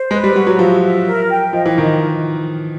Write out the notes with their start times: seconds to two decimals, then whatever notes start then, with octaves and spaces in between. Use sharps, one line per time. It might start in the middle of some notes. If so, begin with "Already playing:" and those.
Already playing: C5
0.11 G#3 B4
0.24 G3
0.35 G3 F#4
0.47 F#3
0.58 F3 E5
0.82 E5
1.07 A#4
1.30 G5
1.53 F3 D#5
1.66 E3
1.78 D#3 A#4